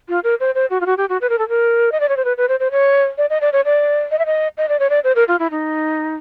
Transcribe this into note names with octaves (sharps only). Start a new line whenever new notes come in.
F4
A#4
C5
C5
F#4
F4
F#4
G4
F#4
B4
A#4
A4
A#4
D#5
D5
C#5
C5
B4
B4
C5
C5
C#5
D5
D#5
D5
C#5
D5
D#5
E5
D#5
D#5
D5
C#5
D5
C5
A#4
F4
E4
D#4